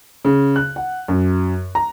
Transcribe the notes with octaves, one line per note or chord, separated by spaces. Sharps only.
C#3
F#6
F#5
F#2
A#5